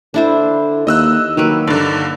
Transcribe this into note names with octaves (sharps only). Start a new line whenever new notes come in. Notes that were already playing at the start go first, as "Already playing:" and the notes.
D3 D4 E4 C5
D#2 D#5 E6 F#6
D#3 F#3 A#3 B4
G2 D3 D5